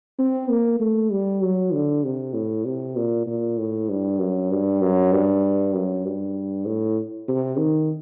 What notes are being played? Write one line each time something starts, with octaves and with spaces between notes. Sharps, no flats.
C4
A#3
A3
G3
F#3
D3
C3
A2
C3
A#2
A#2
A2
G2
F#2
G2
F#2
G2
F#2
G2
A2
C3
D#3